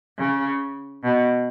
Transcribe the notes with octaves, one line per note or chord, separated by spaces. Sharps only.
C#3
B2